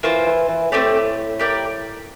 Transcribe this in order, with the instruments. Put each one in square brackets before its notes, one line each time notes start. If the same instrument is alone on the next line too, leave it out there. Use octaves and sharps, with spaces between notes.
[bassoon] E3 [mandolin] A#3 F4 C5
[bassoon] E3
E3
[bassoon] A2 [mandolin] A3 C4 G4 D5
[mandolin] G4 A#4 D5 G5